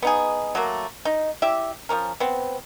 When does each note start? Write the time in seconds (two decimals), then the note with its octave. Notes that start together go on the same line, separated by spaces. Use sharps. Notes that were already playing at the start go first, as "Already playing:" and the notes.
0.02 B3 D#4 G#4
0.55 F#3 A3 A#3
1.05 D#4
1.42 E4 G4 D5 E5
1.89 F3 G#3 C#4 A#4
2.20 B3 C4